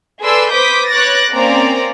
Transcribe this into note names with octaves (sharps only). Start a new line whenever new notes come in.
G#4 A4 B4 D5 C6 E6
B4 C5 D6 D#6 G6 B6
B4 C#5 D6 F#6 A6 A#6
A#3 C4 C#4 D5 A#5